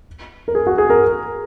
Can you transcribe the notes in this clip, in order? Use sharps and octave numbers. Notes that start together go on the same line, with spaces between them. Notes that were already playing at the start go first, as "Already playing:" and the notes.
A#4
G#4
F#4
G#4
A#4